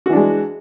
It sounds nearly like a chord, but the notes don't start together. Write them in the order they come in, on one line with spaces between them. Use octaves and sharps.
F#4 E3 D4 G#3